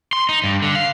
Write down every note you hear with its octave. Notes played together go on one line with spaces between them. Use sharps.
C6
D#4
G2
D3
F5